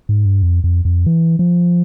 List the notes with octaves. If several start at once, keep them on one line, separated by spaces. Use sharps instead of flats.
G#2
G2
F2
F2
F2
E3
F3